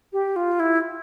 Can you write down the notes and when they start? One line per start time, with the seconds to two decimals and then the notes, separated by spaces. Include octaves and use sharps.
0.13 G4
0.36 F4
0.60 E4